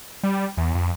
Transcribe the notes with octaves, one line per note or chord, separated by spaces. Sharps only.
G3
E2
F2